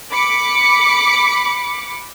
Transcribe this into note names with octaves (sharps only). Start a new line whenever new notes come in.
B5 D6 C#7